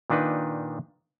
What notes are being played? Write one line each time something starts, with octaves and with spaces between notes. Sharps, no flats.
A#2 D#3 D4 D#4 B4